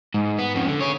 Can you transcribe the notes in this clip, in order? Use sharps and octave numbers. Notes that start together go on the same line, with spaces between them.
G#2
B3
F2 C#3
D3
G#4 C#5